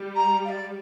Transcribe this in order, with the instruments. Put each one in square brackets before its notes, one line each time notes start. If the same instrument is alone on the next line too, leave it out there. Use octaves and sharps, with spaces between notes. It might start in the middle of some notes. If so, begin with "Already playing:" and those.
Already playing: [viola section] G3
[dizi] A#5
F5
D5